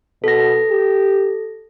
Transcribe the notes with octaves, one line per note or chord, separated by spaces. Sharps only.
B2 A4 A#6
G4